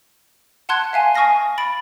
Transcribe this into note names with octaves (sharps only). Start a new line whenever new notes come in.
F#5 A5 C6 F#6 G#6
E5 F5 G#5 A5
G#5 C#6 D#6 F6 A#6 C7
B5 A6 D7